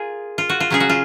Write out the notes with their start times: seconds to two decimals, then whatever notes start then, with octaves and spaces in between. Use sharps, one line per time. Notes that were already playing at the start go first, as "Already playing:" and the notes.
Already playing: F4 G#4 A#4
0.38 F4
0.49 F#4
0.60 F4
0.70 C#3 F#3 C#4 G#4
0.80 F#4
0.89 F4